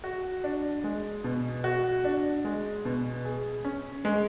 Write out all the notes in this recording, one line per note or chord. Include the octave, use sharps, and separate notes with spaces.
F#4
D4
G#3
B2
F#4
D4
G#3
B2
G#4
C#4
G#3